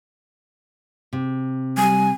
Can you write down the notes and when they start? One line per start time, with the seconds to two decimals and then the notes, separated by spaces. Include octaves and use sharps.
1.13 C3
1.77 G3 G#5